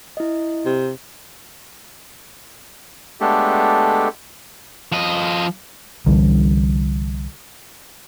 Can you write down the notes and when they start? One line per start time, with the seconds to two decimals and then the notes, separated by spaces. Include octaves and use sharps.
0.17 E4 D#5
0.66 C3
3.21 G#3 A3 B3 D4 G4 A4
4.92 F3 D#5
6.07 C2 D3 E3 G3